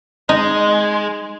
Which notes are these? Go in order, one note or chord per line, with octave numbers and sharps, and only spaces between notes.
G#3 D#4